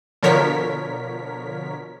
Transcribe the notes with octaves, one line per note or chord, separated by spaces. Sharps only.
B2 D3 F3 A#4 C#5 B6